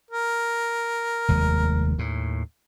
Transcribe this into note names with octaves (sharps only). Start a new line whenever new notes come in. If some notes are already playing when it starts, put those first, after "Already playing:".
A#4
F1 D#2 G#3
D#2 A2